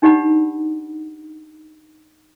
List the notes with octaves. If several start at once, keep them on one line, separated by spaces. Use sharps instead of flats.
D4 D#4 G4 D5 F#5 B5